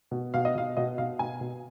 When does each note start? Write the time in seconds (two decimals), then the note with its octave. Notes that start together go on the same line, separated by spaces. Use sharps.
0.11 B2
0.34 B2 F5
0.45 D#5
0.55 B2 F5
0.77 B2 D#5
0.98 B2 F5
1.19 B2 G#5
1.41 B2